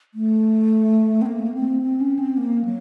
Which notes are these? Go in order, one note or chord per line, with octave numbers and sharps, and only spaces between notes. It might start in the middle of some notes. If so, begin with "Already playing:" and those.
A3
C4
A#3
A3
A#3
C4
C4
C#4
C4
A#3
F#3